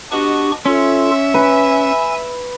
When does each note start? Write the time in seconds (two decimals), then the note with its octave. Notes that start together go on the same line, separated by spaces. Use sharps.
0.12 B3 D4 F#4 G4 D#5 C#6
0.66 C#4 F4 A4 E5
1.34 B4 G#5